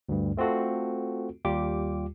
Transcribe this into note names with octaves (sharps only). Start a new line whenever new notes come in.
D2 G2
A3 C4 F4 F#4 A4
D#2 G3 F4 G4 D6